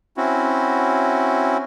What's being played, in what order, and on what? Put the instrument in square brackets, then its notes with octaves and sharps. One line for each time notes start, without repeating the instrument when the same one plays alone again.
[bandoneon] C4 C#4 E4 F#4